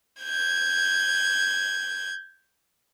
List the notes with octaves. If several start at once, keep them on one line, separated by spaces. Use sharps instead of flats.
G6 G#6